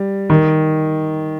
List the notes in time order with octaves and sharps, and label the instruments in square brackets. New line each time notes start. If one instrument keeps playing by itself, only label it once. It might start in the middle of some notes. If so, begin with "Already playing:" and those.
Already playing: [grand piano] G3
D#3